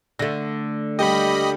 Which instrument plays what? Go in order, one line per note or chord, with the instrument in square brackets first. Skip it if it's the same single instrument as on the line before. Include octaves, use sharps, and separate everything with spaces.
[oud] D3 A3 [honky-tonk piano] A#6
[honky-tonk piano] D#2 G3 G5 [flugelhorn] G4 [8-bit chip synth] D#5 B5